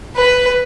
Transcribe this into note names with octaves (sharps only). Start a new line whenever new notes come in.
B4